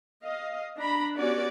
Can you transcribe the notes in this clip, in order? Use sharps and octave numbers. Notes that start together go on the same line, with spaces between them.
D#5 F5
D4 A#5 B5
B3 C#4 F#4 G4 D5